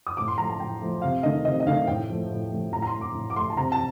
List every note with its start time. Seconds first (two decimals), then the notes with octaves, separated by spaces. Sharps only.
0.06 D#6
0.17 A2 D6
0.28 C6
0.38 F3 A3 A#5
0.50 A5
0.60 A2 G5
0.82 F3 A3
1.02 C3 F5
1.23 D#3 A3 D#5
1.45 C3 D#5
1.60 D#5
1.67 D#3 A3 F5
1.87 A2 G5
2.09 F3 A3
2.30 A2
2.51 F3 A3
2.72 A2 A#5
2.82 A#5
2.87 C6
2.94 A3
3.01 D6
3.14 A2
3.30 D6
3.36 A3 C6
3.50 A5
3.57 C3 A#5
3.72 A5